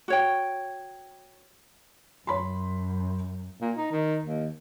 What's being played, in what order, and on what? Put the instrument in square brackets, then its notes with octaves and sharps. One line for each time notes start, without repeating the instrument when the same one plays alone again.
[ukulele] F#4 C#5 G5
[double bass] F#2 [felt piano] C#5 B5 C6
[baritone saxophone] A#2
D#4
D#3
D#2